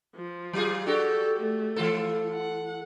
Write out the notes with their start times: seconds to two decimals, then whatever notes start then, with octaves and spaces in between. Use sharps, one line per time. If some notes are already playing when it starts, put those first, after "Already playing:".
0.16 F3
0.53 F#3 F4 G#4
0.86 D4 F#4 G4 A4
1.40 A3
1.76 E3 F4 A4
2.34 F#5